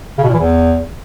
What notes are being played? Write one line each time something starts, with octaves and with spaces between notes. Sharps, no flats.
C#3
B2
A#2
E3
E2